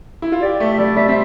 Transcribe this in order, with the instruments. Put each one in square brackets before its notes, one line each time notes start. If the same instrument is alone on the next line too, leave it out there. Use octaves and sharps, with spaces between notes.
[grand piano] E4
F4
[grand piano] G4 [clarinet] D5
[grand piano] A3 [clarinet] E5
[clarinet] E5
[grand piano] G3 [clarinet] D5
[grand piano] G3 [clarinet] E5
[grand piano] C4 [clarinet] E5